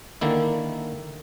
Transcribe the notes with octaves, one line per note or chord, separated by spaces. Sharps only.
D3 D#3 A#3 E4